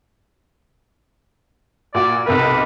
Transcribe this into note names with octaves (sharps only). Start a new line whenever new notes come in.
A#2 F#4 D5
B1 C3 A#4 B4